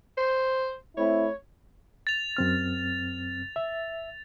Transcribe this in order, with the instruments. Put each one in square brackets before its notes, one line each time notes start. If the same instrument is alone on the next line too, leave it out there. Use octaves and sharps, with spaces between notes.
[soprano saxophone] C5
[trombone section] A3 C4 E4 [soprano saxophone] C#5
[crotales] A6 F7
[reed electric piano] F#2 C4 F6
E5